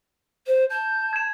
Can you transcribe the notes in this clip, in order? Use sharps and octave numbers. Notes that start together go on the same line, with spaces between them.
C5
A5 G6
G#6 E7